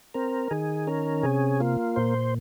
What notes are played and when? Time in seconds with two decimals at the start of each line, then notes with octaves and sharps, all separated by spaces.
0.14 C4 A#4
0.51 D#3 G#4
0.87 C#4 A#4
1.23 C3 G#4
1.60 A#3 F4
1.96 A#2 C5